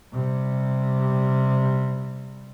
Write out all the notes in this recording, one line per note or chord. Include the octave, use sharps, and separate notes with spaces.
C3 G3